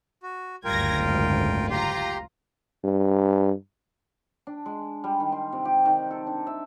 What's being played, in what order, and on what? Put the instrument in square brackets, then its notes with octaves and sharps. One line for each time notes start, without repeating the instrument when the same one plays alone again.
[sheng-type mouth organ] F#4
[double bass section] F#1 D2 [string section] G2 G#6 A#6 [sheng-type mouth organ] F4 A#4 G5
[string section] G#1
[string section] F4 A#5 [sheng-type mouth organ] G4 C6
[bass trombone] G2
[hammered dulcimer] D4
G#3
G3
D#3
C6
C3
G4
D#3
A4
D4
E5